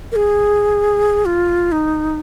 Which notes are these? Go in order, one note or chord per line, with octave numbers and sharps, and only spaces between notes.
A#4
G#4
F4
D#4